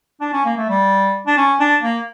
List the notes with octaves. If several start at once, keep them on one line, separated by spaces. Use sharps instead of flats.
D4
C#4
A#3
A3
G3
D4
C#4
D4
A#3